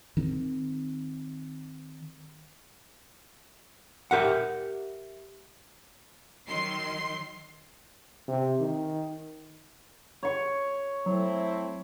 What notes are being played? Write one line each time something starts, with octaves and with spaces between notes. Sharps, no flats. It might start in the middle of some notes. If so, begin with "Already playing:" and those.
D#3 C4
G4 A#4 E5 F#5
D#3 F#3 C6 C7
C3
D#3
C#5 C#6
F#3 A3 C4 E4